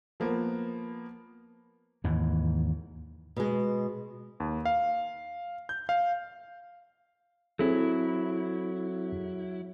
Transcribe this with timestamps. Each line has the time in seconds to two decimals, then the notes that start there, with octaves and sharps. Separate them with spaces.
0.20 F3 A#3 B3
2.04 D#2 G#2 E3
3.36 B2 G#3
4.40 D#2
4.66 F5
5.69 G6
5.89 F5
7.59 F#3 C4 E4 G#4 A4